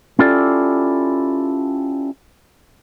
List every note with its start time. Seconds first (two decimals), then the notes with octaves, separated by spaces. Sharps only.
0.19 C#4 E4 F4 G4 A4 D5